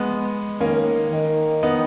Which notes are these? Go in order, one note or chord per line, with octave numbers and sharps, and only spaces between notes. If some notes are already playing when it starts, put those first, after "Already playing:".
Already playing: G#3 B3
D#3 A#3 C#4
D#3
B3 D#4